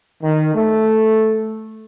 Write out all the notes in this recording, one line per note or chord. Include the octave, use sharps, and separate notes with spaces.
D#3
A3